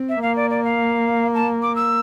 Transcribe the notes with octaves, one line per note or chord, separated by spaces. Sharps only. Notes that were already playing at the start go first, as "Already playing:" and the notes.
Already playing: C4
E5
A#3 F5
D5
D5
F5
A5
D6
E6